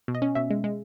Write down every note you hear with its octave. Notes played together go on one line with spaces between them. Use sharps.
B2
D#5
C#4
B2 E5
G#3
G#3